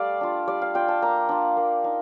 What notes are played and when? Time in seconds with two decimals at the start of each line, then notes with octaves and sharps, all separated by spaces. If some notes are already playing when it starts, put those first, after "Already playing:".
Already playing: G3 A3 D5 F5
0.21 D4 F4
0.47 G3 D5
0.62 F5
0.74 D4 F4 G5
0.88 A5
1.02 A#3 A#5
1.29 D4 F4
1.57 A#3
1.84 D#4